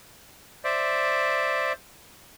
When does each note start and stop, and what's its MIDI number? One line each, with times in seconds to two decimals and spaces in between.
0.64 1.73 72
0.64 1.73 74
0.64 1.73 76